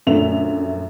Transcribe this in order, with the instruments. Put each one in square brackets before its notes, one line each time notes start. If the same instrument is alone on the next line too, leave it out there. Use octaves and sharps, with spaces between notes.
[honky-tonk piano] A#1 F#2 D3 A3 E5 F7